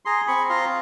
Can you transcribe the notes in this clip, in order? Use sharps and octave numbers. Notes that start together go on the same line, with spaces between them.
G#4 A#5 C6
C4 B5 C#6
F4 A#5 C6